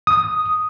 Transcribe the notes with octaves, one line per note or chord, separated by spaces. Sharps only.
D#6